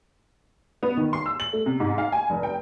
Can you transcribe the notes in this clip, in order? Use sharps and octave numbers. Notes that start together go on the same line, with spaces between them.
B3
D#3
C6
E6
F#7
A3
C3
G#2
F5
G#5
F1
G5